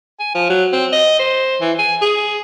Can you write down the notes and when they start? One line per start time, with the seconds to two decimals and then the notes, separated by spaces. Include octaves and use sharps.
0.20 G#5
0.35 F3
0.49 F#3
0.73 C4
0.92 D#5
1.20 C5
1.61 E3
1.79 G#5
2.02 G#4